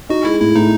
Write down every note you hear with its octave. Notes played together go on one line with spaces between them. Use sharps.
D#4 F#4
G#3 E4
A2 E4
A2 D#4